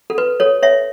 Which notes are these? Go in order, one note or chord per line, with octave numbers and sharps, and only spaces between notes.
A4
B4
A4 C#5
C#5 E5